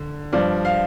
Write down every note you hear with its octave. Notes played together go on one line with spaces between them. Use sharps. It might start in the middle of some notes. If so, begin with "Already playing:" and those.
Already playing: D3
G2 F3 D5
F5